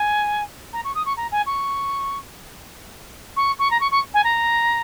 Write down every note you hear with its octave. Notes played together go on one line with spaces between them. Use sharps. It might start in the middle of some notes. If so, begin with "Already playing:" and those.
Already playing: G#5
A#5
C#6
D#6
C#6
A#5
G#5
C#6
C#6
C#6
A#5
C#6
C#6
G#5
A#5